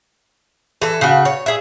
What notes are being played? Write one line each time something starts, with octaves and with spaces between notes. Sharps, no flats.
E3 A4
C#3 F#4
C#5
G#4 E5